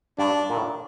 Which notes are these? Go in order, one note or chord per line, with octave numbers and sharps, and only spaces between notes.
G2 D4
A#2
A2